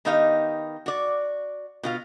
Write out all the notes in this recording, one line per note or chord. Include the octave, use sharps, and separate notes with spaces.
D#3 B3 D#4 G4 D#5 F5
F#4 D5
B2 F4 F5